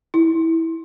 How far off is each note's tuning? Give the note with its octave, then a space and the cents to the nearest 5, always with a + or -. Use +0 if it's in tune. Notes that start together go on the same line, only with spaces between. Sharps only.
E4 -15